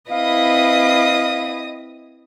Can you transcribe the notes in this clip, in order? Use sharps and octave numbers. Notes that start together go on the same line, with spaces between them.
C4 E4 B4 D#5 F5 D#6